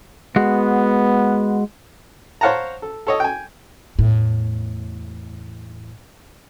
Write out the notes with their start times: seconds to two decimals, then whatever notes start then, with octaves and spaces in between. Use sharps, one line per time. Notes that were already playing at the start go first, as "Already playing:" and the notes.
0.36 G#3 B3 F#4
2.41 C5 C#5 F5 F#5 A5 A#5
2.82 A4
3.07 A4 C#5 D#5
3.20 G5 G#5
3.99 E2 A2